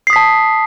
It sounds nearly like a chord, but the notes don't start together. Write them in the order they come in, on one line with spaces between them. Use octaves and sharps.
C7 D#6 B6 A5